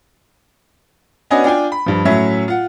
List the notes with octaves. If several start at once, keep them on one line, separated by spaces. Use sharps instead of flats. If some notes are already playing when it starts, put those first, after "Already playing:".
B3 C#4 D4 F#4 D#5 G#5
D4 F4 G5 G#5
B5
G2 F3
A2 F#3 C#4 E5
F4 F#5